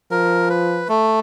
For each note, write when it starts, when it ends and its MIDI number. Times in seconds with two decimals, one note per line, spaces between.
0.11 0.86 53
0.11 0.49 70
0.49 0.88 71
0.89 1.20 57